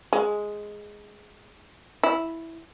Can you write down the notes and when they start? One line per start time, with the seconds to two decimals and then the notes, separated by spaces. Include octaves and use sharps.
0.13 G#3
2.03 E4